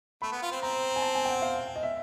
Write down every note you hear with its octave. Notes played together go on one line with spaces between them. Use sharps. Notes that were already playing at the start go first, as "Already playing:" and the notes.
A3 B5
B3
F4
C4
C4 A#5
G#5
A5
G#5
G5
F#5
F5
D#5
E5